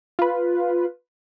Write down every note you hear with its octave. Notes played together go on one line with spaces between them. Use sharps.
F4 B4